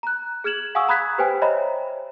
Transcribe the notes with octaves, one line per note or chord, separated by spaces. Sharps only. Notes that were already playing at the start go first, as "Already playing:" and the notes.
A#5 F#6
G#4 F6 G#6 E7 F#7
F5 F#5 G#5 C#6 D#6 E6
A#5 B5 D#6 F#6 G#6 B6
G4 B4 C5 G5 G#5
C5 C#5 D#5 E5 A#5 B5